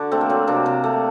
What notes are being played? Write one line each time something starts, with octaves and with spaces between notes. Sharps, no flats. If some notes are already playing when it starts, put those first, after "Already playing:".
Already playing: D3 D4 F#4
A3 C4
A#3
F#3 C4
C3 A#3 D4
C3
A3